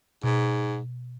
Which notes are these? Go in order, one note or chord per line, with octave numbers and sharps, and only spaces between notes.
G#2 B2